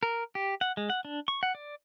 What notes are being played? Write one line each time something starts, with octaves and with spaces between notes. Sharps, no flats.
A#4
G4
F#5
G#3
F#5
D4
C#6
F#5
D5